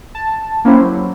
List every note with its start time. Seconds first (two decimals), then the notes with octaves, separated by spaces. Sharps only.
0.15 A5
0.65 A#3 C#4 E4 G4 C5
0.81 F#3